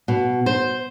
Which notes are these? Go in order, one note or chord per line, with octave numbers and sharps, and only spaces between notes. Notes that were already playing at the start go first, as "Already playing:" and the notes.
B2
C5